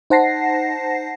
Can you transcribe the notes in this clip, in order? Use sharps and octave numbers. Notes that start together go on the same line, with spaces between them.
D#4 C5 F#5 A5 A#6 C7